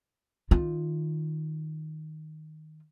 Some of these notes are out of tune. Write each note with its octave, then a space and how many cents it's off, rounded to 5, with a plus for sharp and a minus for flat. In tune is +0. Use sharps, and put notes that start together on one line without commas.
D#3 +0 F4 +0